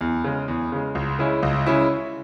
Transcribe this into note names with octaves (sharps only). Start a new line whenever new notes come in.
E2
C#3 G#3
E2
C#3 G#3
C#2
C#3 G#3 C#4 E4
C#2
C#3 G#3 C#4 E4